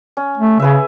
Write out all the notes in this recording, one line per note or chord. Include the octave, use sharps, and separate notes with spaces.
C#4
A3
C#3 G#4 B4 E5